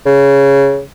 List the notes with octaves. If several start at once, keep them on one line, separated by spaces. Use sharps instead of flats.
C#3